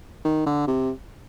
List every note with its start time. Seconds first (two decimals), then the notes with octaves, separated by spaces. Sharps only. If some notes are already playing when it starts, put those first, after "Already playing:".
0.25 D#3
0.46 D3
0.68 C3